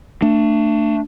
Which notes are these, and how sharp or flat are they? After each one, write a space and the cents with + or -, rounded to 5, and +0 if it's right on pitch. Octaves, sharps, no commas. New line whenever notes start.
A3 +25 D4 +10